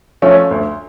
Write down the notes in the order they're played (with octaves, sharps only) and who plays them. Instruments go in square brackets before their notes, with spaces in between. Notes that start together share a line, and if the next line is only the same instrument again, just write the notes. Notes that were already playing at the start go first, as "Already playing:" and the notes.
[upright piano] F3 A3 C#4
D2